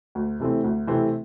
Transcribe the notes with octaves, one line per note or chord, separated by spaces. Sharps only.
D2
C3 E3 A3 C4
D2
C3 E3 A3 C4